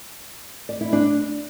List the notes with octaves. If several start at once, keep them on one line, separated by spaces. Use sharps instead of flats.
D5
E4
D4